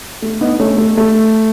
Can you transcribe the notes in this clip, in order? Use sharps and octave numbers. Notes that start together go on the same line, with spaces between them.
A3
B3 D#4
A3 C#4
A3
A3